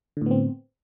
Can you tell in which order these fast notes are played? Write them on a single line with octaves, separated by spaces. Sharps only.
D3 A2 B3 C4